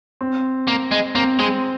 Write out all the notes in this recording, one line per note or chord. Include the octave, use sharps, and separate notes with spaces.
C4
A#3
G#3
A#3 C4
G#3 C4